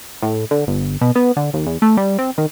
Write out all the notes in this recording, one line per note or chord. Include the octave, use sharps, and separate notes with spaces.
A2
D3
G1
B2
B3
D3
D#2
E2
A3
G3
C4
D#3